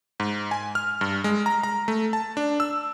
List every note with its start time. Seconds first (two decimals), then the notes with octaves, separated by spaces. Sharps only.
0.20 G#2
0.51 G#5
0.75 F6
1.01 G2
1.24 G#3
1.46 A#5
1.63 A#5
1.88 A3
2.13 A5
2.37 D4
2.60 E6